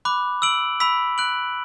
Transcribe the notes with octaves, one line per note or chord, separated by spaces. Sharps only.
B5 D6 F#6
E6 D7 F#7
B5 E6 B6
F#6 D7 F#7